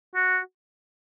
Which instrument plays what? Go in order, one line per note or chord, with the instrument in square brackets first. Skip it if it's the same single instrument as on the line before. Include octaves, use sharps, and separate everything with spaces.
[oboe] F#4